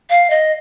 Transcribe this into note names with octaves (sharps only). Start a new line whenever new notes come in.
F5
D#5